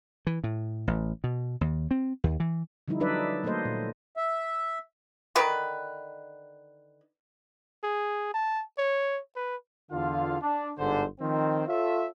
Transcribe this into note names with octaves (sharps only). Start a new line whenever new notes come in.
E3
A2
A1
B2
D#2
C4
D#2
E3
D3 F3 G3 D#4 E4
F#3 D4 D#4 B4 D5 E5
F#3 A3 A#3 A4 C5 D#5
A#2
E5
D3 D#3 B4
G#4
A5
C#5
B4
E2 D3 F4 F5
D4
G1 G#2 D3 C5
D#3 F3 C4
F4 A4 C#5 E5